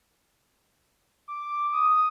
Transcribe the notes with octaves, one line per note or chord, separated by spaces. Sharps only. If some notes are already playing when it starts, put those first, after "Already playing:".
D6
D#6